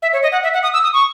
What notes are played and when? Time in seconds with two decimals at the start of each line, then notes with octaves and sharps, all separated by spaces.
0.02 E5
0.13 C#5
0.23 D#5
0.32 F#5
0.43 E5
0.54 F#5
0.63 D#6
0.73 E6
0.83 D#6
0.94 C#6